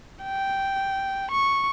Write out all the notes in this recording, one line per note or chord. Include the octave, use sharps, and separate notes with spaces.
G5
C#6